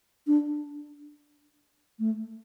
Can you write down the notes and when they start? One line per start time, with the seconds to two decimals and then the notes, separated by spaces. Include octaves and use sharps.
0.27 D4
1.99 A3